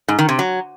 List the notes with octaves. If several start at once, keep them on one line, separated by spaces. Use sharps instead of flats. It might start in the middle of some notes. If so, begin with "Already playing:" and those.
G#2
D#3
C3
F#3